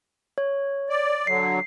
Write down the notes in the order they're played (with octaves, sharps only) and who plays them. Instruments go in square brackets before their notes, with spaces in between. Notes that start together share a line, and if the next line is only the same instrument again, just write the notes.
[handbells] C#5
[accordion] D5
[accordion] D3 F#3 [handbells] C7